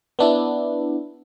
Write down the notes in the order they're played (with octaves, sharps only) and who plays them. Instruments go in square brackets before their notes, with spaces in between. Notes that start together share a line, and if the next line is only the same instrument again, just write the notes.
[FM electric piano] B3 D4 E4